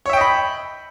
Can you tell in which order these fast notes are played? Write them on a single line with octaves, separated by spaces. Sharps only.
C#5 E5 G5 D#5 B5